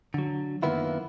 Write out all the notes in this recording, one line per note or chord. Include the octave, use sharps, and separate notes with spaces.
D3 F#3
F#2 D#3 A#3 B3 E4 F4